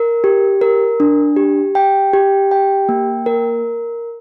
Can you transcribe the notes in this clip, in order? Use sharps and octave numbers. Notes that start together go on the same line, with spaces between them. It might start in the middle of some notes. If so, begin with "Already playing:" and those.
Already playing: A#4
G4
A#4
D4
G4
G5
G4
G5
A#3
A#4